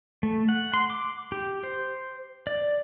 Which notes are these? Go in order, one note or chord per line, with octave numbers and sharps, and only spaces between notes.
A3
F#5
C6
D6
G4
C5
D5